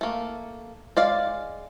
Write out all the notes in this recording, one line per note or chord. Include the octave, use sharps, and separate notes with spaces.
A3 A#3
G#3 D5 F5